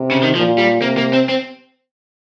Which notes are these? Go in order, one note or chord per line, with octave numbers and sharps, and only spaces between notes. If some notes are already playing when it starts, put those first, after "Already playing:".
Already playing: C3
C#3
D#3
A#2 F3
G3
C3 A#3
A#3
C4
C4